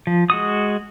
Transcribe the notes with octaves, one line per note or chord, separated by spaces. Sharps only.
F3
G#3 F#4 D#6